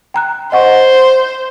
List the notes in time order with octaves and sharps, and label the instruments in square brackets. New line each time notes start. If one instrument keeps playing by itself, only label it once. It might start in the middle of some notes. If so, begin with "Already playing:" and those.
[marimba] G5 A#5 F#6
[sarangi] C5 [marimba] D#5 F#5 C#6